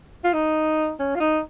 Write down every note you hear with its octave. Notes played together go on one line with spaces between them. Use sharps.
F4
D#4
C#4
F4
D#4